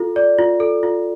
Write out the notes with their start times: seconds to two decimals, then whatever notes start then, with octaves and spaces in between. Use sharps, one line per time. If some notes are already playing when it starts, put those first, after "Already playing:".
Already playing: F4 A4
0.16 D5
0.38 F4
0.60 A4
0.83 F4